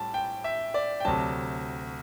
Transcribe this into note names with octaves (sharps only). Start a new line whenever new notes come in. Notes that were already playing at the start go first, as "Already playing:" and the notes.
Already playing: A2 G3 A5
G5
E5
D5
G5
D2 C3 F#3 A5